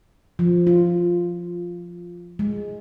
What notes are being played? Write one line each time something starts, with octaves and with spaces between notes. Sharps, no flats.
F3
F4
G#3